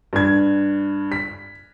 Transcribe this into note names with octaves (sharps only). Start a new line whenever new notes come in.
G2 G#6
B6